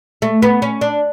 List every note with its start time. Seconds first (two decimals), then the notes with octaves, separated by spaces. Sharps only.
0.22 A3
0.42 B3
0.62 C#4
0.81 D4